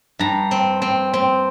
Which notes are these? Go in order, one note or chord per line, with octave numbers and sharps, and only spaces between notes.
G2 A#5
C4
C4
C4